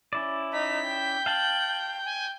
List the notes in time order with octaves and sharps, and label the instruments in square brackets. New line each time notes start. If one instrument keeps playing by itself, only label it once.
[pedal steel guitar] C#4 E4 D5
[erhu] D#4 [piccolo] B6
[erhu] G5
[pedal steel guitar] F5 A5 [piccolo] F#7
[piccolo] G#5